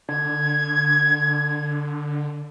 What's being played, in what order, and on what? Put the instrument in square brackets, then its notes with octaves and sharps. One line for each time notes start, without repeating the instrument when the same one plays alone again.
[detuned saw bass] D3 [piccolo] G#6